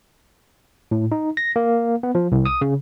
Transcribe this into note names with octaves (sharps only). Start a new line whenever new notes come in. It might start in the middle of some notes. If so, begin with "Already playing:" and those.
A2
D#4
A#6
A#3
B3
F3
C2
D#6
C#3